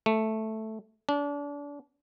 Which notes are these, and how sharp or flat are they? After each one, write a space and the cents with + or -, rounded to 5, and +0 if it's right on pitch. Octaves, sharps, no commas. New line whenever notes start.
A3 -5
D4 -35